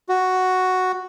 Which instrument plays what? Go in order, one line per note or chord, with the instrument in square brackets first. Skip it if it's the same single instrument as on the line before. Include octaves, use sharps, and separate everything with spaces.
[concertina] F#4